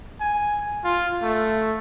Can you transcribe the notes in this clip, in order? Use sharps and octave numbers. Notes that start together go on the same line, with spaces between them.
G#5
F4
A3